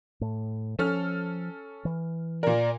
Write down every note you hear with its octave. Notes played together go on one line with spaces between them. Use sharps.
A2
F3 C#4 A4 F6
E3
A#2 A#4 D5